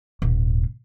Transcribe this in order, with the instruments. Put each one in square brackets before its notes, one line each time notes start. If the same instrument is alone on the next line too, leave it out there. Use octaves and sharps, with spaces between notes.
[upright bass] D#1 G#2